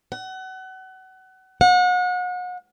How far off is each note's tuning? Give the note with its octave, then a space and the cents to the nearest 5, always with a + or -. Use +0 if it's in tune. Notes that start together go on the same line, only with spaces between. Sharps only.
F#5 +30
F#5 -35